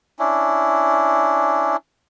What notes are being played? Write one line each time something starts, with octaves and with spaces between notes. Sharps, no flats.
C#4 D4 E4